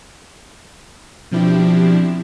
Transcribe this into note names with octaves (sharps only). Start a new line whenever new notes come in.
B2 F3 C4 D4 E4 G4